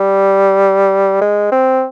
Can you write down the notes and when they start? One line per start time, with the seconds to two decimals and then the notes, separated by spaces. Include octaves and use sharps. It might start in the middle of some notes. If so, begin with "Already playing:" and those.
Already playing: G3
1.21 G#3
1.52 C4